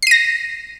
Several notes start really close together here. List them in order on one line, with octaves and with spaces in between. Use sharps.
C7 D#7 A#6